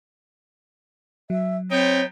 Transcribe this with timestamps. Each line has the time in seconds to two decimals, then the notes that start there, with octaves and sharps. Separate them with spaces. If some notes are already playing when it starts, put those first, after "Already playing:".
1.30 F#3 E5
1.70 B3 C4 D#4 C#5 G5